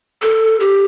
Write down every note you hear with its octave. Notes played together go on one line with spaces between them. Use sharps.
A4
G4